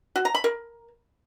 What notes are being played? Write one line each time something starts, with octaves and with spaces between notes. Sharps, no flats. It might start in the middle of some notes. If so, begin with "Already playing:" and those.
F#4
A#5
B5
A#4